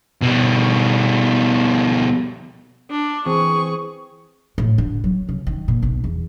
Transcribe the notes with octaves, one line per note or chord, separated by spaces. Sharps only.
B2 G3
D4
E3 C4 G#4 C#6
A2
D3
F#3
C#3
D#3
A#2
B1
E2